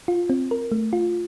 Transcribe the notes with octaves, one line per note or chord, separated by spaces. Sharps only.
F4
C4
A#4
A3
F4